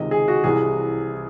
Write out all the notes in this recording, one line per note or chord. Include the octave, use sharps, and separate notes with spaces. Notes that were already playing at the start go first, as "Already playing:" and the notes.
Already playing: C#2 C3 D#3 D#5
G#4
F#4
C2 C3 E3 G#4